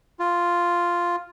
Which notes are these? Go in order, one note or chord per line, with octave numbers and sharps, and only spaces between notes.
F4